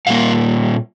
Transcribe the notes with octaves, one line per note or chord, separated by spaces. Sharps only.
A#2 G3 A#3 F5